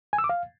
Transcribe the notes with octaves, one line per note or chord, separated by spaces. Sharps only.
G#5
E6
D6
F5